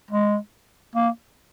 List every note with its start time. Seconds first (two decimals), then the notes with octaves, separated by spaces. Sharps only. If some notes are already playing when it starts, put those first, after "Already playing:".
0.11 G#3
0.95 A#3